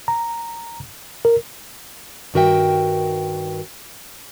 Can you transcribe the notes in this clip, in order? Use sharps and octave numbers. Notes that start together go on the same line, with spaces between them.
A#5
A#4
G2 D#3 F#4 A#4 E5 G5